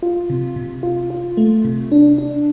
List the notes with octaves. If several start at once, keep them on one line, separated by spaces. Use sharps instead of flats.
F4
C3
C3
F4
F4
A3
C3
D4
D4